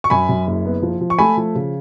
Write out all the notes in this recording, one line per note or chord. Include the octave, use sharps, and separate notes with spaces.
C#6
F#2 G#5 B5
F#2
F#1
B3
F3
F3
C#6
A3 G#5 B5
F3
C#3